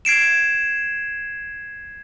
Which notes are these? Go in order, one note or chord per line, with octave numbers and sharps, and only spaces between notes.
G#6 C7 D7 E7